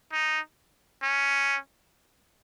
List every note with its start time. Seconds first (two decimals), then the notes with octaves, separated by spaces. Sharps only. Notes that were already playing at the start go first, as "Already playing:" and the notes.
0.12 D#4
1.03 C#4